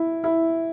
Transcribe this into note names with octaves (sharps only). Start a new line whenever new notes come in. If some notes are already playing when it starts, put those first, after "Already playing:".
Already playing: E4
E4